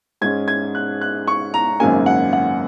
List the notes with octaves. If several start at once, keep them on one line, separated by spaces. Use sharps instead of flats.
G#2 G#3 C#4 G#6
G#6
F#6
F#6
C#6
A#5
G#1 F#2 C#3 A#3 G#5
F#5
F#5